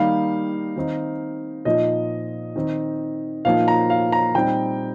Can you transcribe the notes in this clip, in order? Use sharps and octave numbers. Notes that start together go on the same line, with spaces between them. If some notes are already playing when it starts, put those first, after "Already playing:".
Already playing: D#3 G3 A#3 D#4 F5
D#3 C4 D#4
A#2 F3 D#4 D#5
D#3 C4 D#4
A#2 F3 A#3 D#4 F5
A#5
F5
A#5
A#2 G3 C4 D#4 G5